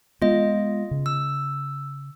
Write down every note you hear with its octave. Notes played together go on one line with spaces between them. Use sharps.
G#3 B3 F4 D#5
C#3
E6